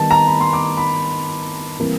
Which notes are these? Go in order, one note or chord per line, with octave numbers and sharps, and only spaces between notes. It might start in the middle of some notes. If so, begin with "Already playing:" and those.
Already playing: D#3 G3 B3 A5
A#5
B5
C6
D6
B5
C3 E3 G3 A#3